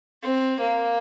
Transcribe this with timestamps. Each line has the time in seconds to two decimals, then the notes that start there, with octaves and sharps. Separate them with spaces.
0.22 C4
0.60 A#3